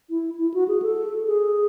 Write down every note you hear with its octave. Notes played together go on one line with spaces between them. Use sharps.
E4
E4
F#4
G#4
A4
G#4